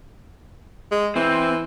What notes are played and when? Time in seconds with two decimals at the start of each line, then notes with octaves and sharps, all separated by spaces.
0.91 G#3
1.16 E3 C4